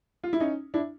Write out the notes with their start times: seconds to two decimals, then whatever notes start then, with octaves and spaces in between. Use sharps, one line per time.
0.24 F4
0.33 E4
0.40 C#4 D#4
0.74 D4 E4